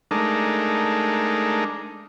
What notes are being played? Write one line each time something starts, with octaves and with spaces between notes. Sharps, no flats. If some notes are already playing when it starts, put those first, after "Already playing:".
G#3 A3 D4 D#4 A#4